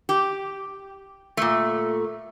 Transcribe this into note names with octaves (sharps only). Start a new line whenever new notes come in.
G4
A#2 A3